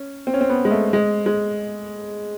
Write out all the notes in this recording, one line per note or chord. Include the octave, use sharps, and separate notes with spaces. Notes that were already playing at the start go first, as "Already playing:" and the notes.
Already playing: C#4
C4
C#4
C4
B3
G#3
A3
G#3
G#3